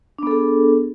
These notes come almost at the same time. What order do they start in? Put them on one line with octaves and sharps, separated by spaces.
D4 B3 A4 G#4